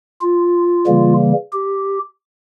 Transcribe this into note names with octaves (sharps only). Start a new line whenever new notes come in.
F4
C#3 E3 G3 A#3
G4